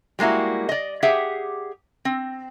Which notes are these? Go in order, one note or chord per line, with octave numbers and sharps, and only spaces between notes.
G3 G#3 A#3 E4 F#4
D5 D#5
G4 G#4 E5 F#5
C4